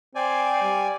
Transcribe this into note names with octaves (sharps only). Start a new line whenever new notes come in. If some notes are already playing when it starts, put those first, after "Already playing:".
C4 D5 G#5
G3